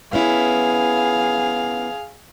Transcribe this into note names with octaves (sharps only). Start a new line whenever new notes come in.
B3 C#4 E4 G#4 F5